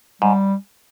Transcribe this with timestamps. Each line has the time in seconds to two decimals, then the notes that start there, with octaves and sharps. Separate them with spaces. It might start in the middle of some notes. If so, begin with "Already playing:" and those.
0.22 G#2 G3